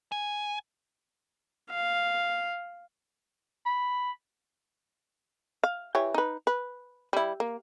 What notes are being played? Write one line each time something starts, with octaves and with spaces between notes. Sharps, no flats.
G#5
F5
B5
F5
E3 G4 C#5
D#4 B4
B4
G3 E4
A#3